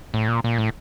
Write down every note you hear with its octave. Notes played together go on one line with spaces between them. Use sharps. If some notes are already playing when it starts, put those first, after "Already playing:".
A2
A#2
A#2
A2